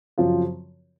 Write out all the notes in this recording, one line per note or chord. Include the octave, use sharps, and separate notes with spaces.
F#2 C#3 F3 C4 F4